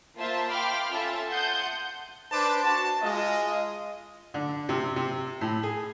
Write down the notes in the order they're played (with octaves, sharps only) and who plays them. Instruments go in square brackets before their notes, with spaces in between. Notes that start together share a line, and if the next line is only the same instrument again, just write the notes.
[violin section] A#3 F4 C5 E5 A5
F5 G5 B5 C6 D6 F6
C#4 F4 A4 E5 A5
F#5 A5 C6 D#6 G6
[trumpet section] D4 B4 C5 A5 D6
F#4 A5
G#3 F4 D#5
[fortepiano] D3
C3
C3
A2
G#4